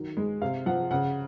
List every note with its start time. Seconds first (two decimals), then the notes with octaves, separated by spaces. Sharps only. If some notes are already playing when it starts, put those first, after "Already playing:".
Already playing: D#3 F#3
0.17 G#3
0.42 C3 F5
0.66 F3 F#5
0.91 C#3 F#5